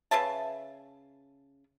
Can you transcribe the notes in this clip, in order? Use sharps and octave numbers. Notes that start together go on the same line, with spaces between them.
C#3 B4 E5 A5